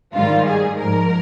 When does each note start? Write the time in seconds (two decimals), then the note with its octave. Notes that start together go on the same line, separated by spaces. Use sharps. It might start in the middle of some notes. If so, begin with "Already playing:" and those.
0.14 G#2 D#3 G3 F4
0.45 G#4
0.78 G#2 F3 A#4